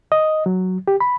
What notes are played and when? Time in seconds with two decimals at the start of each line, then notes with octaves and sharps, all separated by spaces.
0.12 D#5
0.46 F#3
0.88 G4
1.00 B5